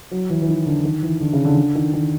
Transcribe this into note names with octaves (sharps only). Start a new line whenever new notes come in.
F#3
E3
E3
D#3
D3
D#3
E3
D3
C#3
D3
D3
D#3
D#3